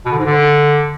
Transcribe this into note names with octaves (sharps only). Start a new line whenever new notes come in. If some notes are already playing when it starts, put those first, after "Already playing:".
B2
D3
G#2
D3